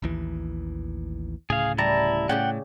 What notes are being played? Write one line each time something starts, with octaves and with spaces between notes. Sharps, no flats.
A1 D#2 E3
D1 A2 C#3 G#4 F5
G3 E4 A5 A#5
A2 C#3 C#4 G4 F#5 G5